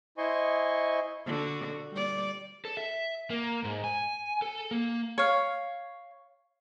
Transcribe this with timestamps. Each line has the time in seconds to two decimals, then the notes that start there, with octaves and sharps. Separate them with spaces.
0.18 E4 C5 D#5 G#5 C6 C#6
1.26 D3 F#4
1.91 G3 D5
2.65 A4
2.77 E5
3.30 A#3
3.64 G#2
3.84 G#5
4.42 A4
4.71 A#3
5.18 C#5 F5